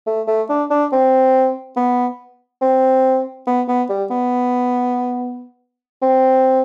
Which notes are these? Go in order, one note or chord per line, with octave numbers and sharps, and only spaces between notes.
A3
A3
D4
D4
C4
B3
C4
B3
B3
G3
B3
C4